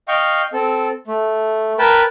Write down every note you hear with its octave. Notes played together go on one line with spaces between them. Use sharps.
D#5 F5 G5 C#6
C4 A4
A3
A#4 B4 G5 A5 B5